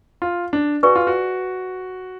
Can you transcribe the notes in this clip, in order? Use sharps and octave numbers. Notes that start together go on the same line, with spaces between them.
F4
D4
F#4 G#4 B4 D5 G#5 C#6
F4
F#4